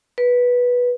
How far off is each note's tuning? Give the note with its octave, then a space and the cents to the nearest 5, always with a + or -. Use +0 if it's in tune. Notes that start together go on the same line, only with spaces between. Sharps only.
B4 -10